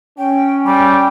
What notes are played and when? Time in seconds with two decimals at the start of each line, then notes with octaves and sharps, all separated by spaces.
0.18 C#4 G5
0.66 G3 G5